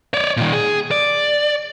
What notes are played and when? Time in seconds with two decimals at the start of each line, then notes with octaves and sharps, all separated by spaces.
0.14 C#5 D5
0.37 A#2 D#3
0.53 G#4
0.91 D5